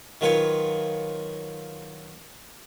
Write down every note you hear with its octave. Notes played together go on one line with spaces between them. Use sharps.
D#3 F#3 F4 B4 C#5